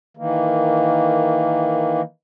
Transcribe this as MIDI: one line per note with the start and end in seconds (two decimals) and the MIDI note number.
0.17 2.01 51
0.17 2.01 52
0.17 2.01 58